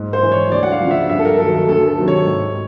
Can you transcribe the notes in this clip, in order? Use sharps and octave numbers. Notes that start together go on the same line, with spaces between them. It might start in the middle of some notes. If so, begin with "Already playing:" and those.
Already playing: G#2
C5
E3
C#5
D2 D5
F#5
F5
C#3 F3
E5
G2 E5
A4
A#4
D#3 F#3 A4
A4
D2 A4
A4
C3 D#3 F#3
C#5
G#2